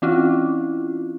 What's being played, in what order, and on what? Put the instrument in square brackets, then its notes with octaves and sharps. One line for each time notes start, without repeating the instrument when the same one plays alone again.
[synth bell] E3 C4 C#4 E4 F4